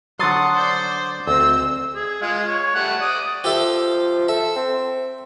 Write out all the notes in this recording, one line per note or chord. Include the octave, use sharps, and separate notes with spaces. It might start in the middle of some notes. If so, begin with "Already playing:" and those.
D3 F#3 F#5 C6 D#6 A6
C5 D5
D2 C4 D#5 E6
G#4
G#3 F4
C#5
G3 A3 F#5
D5 D6 D#6
F3 G4 A4 E5
A4 E5
C4